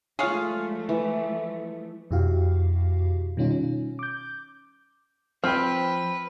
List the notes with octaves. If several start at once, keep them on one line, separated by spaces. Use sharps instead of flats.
F3 G#3 A3 F4 G#4 C#5 F5 F#5
E3
F2 B2 E4 F#4 G4 F5
B2 D#3 G3 C#4 D#4 F4
C#4
D6 G6
F3 C4 B4 G5 F6